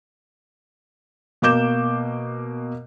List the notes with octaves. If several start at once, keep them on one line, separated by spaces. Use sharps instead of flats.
B2 A#3 D6 G6 E7